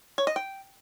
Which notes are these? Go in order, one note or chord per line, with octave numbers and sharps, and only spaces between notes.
C#5
D#5
G5